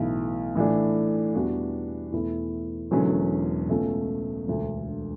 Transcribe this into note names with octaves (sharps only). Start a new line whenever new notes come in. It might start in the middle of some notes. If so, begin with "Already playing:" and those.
Already playing: B1 A2 E3 B3
A2 E3 A3 D4
E2 B2 G3 D4 F#4
E2 B2 A3 E4
E1 E2 D3 F#3 C#4
C#2 B2 A3 C#4
E1 D2 D3